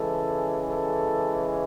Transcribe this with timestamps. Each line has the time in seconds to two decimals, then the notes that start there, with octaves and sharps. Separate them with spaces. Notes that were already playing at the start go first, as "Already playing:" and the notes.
Already playing: C#3 E3 G#3 A4
0.67 A4